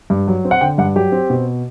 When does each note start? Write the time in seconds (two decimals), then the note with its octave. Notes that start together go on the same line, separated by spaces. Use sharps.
0.10 G2
0.28 F#3
0.45 C4
0.51 F#5
0.61 D3 G5
0.78 G2 F#5
0.96 F#3 G4
1.12 C4
1.30 B2